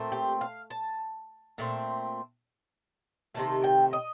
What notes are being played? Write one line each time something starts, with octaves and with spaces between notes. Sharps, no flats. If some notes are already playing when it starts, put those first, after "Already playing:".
Already playing: A#2 A3 C4
G4
F5
A5
A#2 A3 C4
C3 D#3 A3 A5
G5
D#5